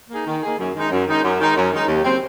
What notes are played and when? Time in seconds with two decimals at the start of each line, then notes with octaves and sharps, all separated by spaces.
0.10 A#3 D#4 G#4
0.27 D#3
0.43 A#3 D#4 G#4
0.58 F#2
0.75 D#3 G#3 D#4
0.91 F#2
1.07 D#3 G#3 D#4
1.23 F#2
1.40 D#3 G#3 D#4
1.56 F#2
1.72 D#3 G#3 D#4
1.88 D#2
2.04 C#3 F#3 C4